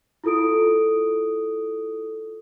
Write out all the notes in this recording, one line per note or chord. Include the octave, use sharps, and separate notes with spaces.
E4 F4 A4 D#6 D7